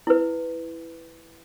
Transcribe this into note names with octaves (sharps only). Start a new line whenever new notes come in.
E4 B4